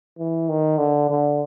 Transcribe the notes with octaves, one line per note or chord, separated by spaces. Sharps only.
E3
D#3
D3
D3